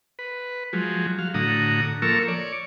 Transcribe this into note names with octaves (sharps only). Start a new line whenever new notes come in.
B4
F3 F#3 G#3
F#3 F5
A2 D3 F#4 A#5 D#6
F3 A#3 A4 A#4 C#6 E6
C#5 D5